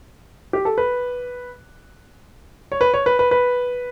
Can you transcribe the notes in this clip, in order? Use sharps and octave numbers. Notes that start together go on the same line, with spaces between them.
G4
A4
B4
C#5
B4
C#5
B4
B4
B4